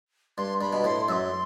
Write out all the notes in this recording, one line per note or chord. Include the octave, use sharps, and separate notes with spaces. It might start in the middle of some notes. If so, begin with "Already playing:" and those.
G2 C6
G2 B5
B2
A2 C6
F#2 C6 E6